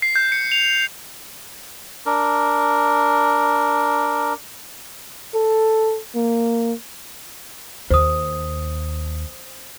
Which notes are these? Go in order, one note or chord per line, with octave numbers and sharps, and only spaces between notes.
C7
G6
C#7
F7
D4 A#4
A4
A#3
D#2 C5 D#6